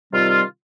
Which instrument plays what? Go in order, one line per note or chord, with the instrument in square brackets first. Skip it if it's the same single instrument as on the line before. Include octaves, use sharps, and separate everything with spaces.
[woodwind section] C3 D#3 G3 C4 F4